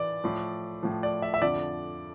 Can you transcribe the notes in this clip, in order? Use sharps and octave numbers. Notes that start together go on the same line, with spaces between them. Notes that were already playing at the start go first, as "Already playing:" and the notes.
Already playing: E3 D5
A2 F3
A2 F3
D5
E5
E5
F2 D3 F3 D5